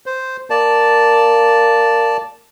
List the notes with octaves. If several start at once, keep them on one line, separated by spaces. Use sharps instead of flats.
C5
A#3 D5 A5